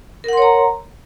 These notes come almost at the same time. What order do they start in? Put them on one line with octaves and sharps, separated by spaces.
A#4 F#5 C6 C#5 A#5